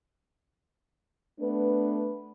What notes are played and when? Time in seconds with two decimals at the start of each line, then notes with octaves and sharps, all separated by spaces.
1.38 A3 B3 D4 B4